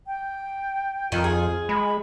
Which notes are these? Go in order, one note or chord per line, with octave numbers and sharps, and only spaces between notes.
G5
F2 D#3 F4
G#4
G#3 B5